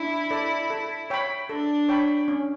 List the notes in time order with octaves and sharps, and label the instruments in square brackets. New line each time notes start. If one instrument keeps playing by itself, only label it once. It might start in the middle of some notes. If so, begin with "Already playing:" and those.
Already playing: [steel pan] D4 [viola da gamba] E4
[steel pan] A4 D5
A4
C#5 G5 B5
[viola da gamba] D4 [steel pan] A4
[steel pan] C#5 G5 B5
C#4